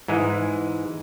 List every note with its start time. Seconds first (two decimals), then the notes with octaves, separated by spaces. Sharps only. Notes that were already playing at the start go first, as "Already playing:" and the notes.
0.08 G#2 E3 G#3